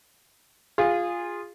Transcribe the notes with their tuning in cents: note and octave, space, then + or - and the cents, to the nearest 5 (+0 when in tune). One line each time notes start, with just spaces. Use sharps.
F4 +0 G#4 -20